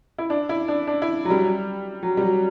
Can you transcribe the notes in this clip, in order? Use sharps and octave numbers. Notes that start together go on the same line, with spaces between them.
E4
D4
E4
D4
D4
E4
F#3
G3
F#3
G3
F#3